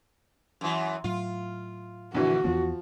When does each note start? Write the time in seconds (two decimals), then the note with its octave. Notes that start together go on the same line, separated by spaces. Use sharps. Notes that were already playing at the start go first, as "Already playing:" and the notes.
0.61 F#2 E3
1.04 A2 F#3 F4
2.15 A#1 D3 E3 F#4
2.44 E2 E3 F3 B3